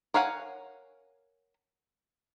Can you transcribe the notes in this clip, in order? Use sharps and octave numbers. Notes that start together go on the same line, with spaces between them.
A#4 C#5 F5 F#5 G#5